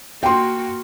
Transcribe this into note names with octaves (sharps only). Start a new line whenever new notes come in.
A#3 F#4 G5 C6